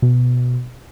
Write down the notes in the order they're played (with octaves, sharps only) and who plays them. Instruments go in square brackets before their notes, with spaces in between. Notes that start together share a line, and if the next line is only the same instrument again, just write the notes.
[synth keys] B2